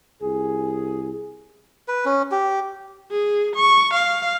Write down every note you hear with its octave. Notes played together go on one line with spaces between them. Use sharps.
C2 G#4
B4
C#4
G4
G#4
C#6
F5